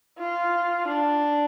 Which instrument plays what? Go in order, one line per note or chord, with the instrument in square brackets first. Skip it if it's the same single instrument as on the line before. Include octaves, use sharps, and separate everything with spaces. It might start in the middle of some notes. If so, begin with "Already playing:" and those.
[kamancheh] F4
D4